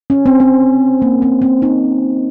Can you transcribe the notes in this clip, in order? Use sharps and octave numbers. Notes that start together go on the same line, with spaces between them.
C#4
C4
C4
A#3
C4
C4
D#4